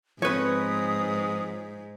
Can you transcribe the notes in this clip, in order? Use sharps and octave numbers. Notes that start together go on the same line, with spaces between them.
G#2 F3 B3 C4 B4 C#5 D#6